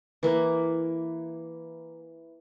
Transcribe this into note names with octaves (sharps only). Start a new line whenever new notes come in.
E3 A#3